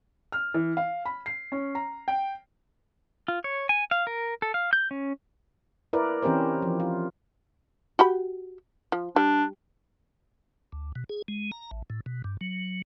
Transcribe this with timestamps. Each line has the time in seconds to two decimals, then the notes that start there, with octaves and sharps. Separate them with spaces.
0.32 F6
0.54 E3
0.77 F5
1.05 B5
1.26 C7
1.52 C#4
1.75 A#5
2.08 G5
3.28 F4
3.44 C#5
3.69 G#5
3.91 F5
4.07 A#4
4.42 A4
4.54 F5
4.73 G6
4.91 C#4
5.93 E4 A#4 B4 D5
6.23 E3 C4 C#4 G4 A#4 C5
6.62 F3
6.80 F4
7.99 F#4 G4 B5
8.92 F3
9.16 G3 D4
10.72 D2
10.95 B2
11.09 G#4
11.28 G#3
11.52 A#5
11.71 A1
11.90 A2
12.06 B2
12.24 G2
12.41 F#3